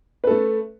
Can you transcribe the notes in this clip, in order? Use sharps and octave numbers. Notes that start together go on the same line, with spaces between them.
A3 A4 B4